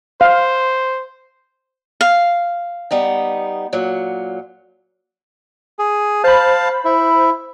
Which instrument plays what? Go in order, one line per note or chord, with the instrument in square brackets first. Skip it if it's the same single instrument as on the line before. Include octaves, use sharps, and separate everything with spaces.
[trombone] C5 [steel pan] F5
[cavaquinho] F5
[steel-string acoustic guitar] G3 B3 D#4
A#2 F#3
[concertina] G#4
[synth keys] C5 B5 [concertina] F5 A5
[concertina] E4